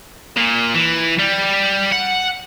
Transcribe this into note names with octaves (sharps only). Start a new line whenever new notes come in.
A#2
E3
G3
F#5